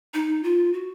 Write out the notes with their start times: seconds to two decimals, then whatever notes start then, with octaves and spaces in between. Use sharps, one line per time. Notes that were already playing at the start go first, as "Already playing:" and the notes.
0.14 D#4
0.43 F4
0.73 F#4